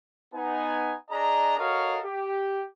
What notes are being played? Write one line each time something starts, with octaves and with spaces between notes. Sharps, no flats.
B3 D#4 G#5
D4 G#4 D#5 A#5
F#4 A4 A#4 C#5 D#5 F5
G4